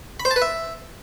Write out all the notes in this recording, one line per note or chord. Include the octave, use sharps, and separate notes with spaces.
B5
C5
A5
B4
E5